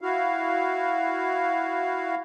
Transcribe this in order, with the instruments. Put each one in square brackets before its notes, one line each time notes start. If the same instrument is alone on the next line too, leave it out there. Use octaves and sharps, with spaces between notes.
[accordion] E4 F#4 F5